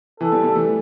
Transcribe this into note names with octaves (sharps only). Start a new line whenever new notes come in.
E3 A4
G3
G3
E3 A3